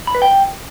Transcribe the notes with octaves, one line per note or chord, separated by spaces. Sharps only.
B5
B4
G5